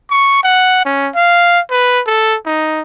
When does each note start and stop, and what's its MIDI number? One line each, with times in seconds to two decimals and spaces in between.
0.10 0.40 85
0.44 0.84 78
0.85 1.09 61
1.15 1.60 77
1.70 2.01 71
2.07 2.37 69
2.46 2.82 63